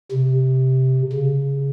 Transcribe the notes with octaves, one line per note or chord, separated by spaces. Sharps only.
C3
C#3